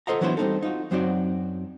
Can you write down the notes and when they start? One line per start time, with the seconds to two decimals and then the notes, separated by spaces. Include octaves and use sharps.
0.07 F4 A4 C5 D#5 F#5 A#5
0.21 E3 F#3 B3 D4 E4 C5
0.37 G3 C4 C#4 D#4 F#4 A4
0.62 D#4 F4 F#4
0.91 F#2 F#3 C4 D#4 F#4 D5